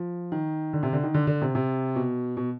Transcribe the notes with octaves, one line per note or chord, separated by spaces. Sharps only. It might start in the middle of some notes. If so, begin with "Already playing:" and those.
Already playing: F3
D#3
D3
C3
D3
D#3
D3
D3
C3
C3
B2
B2